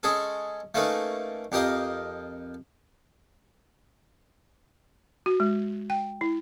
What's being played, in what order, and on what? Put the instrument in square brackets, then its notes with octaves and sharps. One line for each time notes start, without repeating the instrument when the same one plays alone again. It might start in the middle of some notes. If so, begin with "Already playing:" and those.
[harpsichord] G#3 C#4 G#4 A4
A3 A#3 C#4 D#4 B4
F2 G4 A#4 D#5 F5
[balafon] F#4
G#3
G5
E4